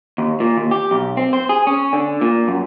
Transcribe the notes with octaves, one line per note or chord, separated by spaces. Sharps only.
D#2
A#2
D#2
G4
B1
C4
C5
G#4
C#4
D3
A#2
F#2